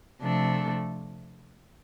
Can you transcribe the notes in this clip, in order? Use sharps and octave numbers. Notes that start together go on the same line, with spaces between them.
C3 F3 A3 D4 A4